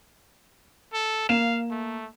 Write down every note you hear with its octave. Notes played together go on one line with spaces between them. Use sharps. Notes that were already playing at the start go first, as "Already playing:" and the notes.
A4
A#3 F5 E7
A3